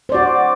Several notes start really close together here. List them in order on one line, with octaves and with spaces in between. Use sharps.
C5 D5 F#4